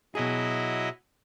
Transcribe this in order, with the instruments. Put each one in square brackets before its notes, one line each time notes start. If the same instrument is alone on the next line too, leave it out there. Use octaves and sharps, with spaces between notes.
[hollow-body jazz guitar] B2 G#4 [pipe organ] F#3 E4 D#5